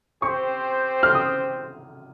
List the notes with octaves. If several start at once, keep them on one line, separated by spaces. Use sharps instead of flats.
C4 G4 C5 C#6
F6
D#6